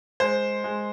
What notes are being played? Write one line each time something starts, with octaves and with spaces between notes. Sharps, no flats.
G#3 C5
G#3